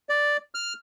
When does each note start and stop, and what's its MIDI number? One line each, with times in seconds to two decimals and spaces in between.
0.09 0.37 74
0.55 0.73 89